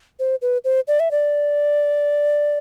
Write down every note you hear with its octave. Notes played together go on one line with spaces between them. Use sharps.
C5
B4
C5
D5
E5
D5